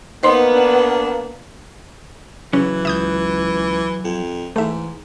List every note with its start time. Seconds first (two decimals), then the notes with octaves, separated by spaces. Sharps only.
0.23 A#3 B3 D#4 B4 C5 C6
0.55 D4
2.53 C#3 E3 F#3 C#4
2.85 C#2 E5 D#6 G6
4.05 F2
4.56 G#2 E3 A3 E5